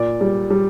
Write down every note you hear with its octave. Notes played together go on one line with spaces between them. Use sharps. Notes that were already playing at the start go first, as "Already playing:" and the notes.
Already playing: A#2 D5
G3
G3